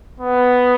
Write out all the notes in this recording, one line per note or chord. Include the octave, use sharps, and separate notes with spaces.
B3